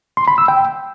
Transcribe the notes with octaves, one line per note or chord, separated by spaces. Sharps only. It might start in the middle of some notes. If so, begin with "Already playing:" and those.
C6
B5
E6
G5